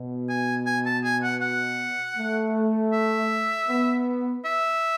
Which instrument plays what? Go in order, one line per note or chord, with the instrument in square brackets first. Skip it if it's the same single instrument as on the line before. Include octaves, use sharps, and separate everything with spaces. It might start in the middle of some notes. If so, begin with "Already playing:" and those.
Already playing: [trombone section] B2
[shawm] G#5
G#5
A5
G#5
F#5
F#5
[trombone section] A3
[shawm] E5
[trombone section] B3
[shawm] E5